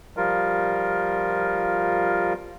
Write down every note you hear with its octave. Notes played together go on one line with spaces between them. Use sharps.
F3 G3 F4 A#4